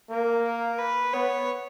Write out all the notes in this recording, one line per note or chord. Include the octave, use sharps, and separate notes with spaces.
A#3 A#4
A#4
B4
B3 C#5